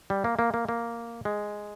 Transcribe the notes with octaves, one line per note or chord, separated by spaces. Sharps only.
G3
A#3
A#3
A#3
A#3
G#3